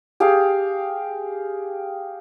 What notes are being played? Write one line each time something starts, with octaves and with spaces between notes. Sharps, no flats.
G4 G#4 F5